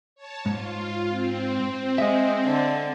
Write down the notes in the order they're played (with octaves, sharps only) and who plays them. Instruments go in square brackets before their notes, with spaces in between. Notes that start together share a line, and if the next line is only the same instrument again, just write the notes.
[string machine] C#5 A5
[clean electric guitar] G#2 [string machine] F4
[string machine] C4
[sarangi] G#3 [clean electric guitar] D#5 E5
[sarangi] D3